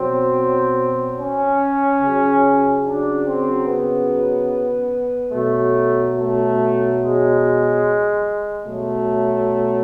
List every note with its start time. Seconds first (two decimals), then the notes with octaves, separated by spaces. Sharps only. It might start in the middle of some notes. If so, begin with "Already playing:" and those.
Already playing: B2 F#3 C4
1.18 C#4
2.01 C#3 F#3
2.83 D4
3.25 C4
3.67 B3
5.33 B2 F#3 A3
6.16 A3
6.99 G#3
8.65 B2 F#3 A3